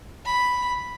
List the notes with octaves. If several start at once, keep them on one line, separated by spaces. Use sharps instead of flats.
B5